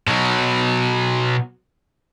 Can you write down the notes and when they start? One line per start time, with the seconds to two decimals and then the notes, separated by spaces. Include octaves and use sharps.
0.07 B2 F#3